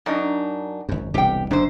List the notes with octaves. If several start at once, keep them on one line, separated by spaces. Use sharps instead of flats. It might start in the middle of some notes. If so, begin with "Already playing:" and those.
F#2 D4 D#4
G#1 F#2
E1 C2 A2 G4 G5
F#1 F#2 B2 D4 C5